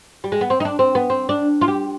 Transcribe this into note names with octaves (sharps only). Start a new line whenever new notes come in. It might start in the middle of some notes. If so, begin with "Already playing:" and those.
G3
G#3
B3
C4
D#4
D4
C4
B3
C4
D4
F4
G4